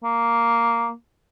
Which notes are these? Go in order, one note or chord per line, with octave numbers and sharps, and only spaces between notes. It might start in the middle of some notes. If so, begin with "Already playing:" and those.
A#3